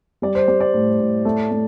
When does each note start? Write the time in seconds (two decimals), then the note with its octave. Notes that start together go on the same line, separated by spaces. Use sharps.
0.22 G3 D5
0.35 C5
0.48 G3 D5
0.60 D5
0.74 A2
1.00 A2
1.25 A3
1.51 A3